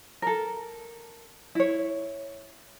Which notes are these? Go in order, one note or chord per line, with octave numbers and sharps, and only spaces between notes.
A4 A#4
E4 C#5